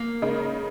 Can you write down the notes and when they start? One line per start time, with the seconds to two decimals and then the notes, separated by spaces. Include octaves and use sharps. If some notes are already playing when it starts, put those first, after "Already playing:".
Already playing: A#3
0.22 C#3 G#3 D#4 A#4